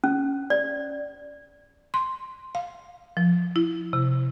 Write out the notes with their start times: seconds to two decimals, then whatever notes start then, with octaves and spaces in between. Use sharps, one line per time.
0.04 C#4
0.50 D5
1.94 C6
2.55 F5
3.17 F3
3.56 E4
3.93 C3